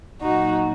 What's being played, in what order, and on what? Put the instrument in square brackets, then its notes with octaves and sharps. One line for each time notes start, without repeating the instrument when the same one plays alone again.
[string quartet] A#2 F#3 D#4 F#4